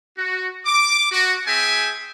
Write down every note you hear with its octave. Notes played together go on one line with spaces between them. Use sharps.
F#4
D6
F#4
C4 G#4 E5 G5 G#5